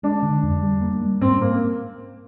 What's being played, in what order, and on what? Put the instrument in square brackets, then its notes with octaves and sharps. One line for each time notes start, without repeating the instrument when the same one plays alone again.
[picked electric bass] G#3 [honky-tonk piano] D4
[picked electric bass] D3
F2
G3
A#3
G3
[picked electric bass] G#2 [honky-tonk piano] C4
[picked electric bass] G#2 [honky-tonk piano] A#3